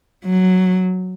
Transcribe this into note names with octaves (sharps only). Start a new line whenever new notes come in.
F#3